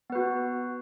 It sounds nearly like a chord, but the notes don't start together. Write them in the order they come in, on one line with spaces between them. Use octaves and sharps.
B3 B4 F#4